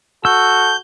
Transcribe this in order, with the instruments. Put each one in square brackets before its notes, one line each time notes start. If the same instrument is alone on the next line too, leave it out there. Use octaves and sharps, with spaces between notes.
[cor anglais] F#4 [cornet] A4 [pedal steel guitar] E6 [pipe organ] G6